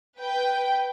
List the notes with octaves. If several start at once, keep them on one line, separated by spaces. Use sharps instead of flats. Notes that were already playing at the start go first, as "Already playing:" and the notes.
B4 G5